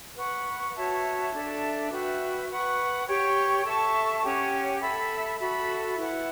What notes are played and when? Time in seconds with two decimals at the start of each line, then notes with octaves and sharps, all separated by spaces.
0.17 B4 F#5 C#6
0.76 F#4 C#5 E5 A5
1.34 D4 A4 E5
1.91 F#4 B4 E5 G5
2.49 B4 F#5 C#6
3.07 G4 C#5 G5 C#6
3.65 A4 E5 A5 C#6
4.24 C#4 G4 C#5 F#5
4.81 A4 E5 B5
5.39 F#4 A4 E5 B5
5.97 E4 B4 F#5